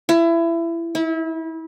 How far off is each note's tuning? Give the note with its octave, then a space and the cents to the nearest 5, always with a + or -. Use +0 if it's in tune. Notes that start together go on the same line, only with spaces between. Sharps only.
E4 +25
E4 -30